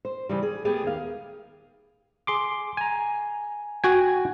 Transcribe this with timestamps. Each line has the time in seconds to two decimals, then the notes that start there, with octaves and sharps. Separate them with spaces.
0.05 C5
0.29 C#3 E3 G3
0.43 G#4
0.65 A3 B3 G4 G#4
0.83 D#2 F5
2.27 G#4 C6 D6
2.77 G#5 A#5
3.84 F#4 G5 G#5